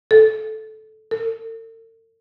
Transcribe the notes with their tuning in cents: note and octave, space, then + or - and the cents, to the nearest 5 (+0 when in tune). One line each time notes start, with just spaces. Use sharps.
A4 -10
A4 +45